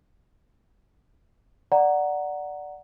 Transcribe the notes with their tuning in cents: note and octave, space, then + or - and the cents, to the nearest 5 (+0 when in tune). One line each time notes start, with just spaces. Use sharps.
D5 +0 F#5 +0 A#5 +0